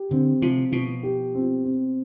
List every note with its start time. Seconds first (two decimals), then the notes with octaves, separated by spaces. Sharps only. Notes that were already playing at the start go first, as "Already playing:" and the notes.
Already playing: G4
0.11 D3 C4
0.42 C3 F3
0.72 B2 F3
1.03 G4
1.35 C4
1.64 C4